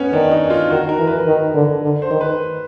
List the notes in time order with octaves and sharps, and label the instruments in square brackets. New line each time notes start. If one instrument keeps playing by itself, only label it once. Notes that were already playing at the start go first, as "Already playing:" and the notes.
Already playing: [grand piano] B3 C#4
[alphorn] D#3 [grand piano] D4
[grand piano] D#4
F4
[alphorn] D#3 [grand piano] F#4
[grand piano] A#4
[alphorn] E3
[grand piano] B4
[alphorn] D#3
D3
D3
[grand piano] C5
[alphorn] D#3
[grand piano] B4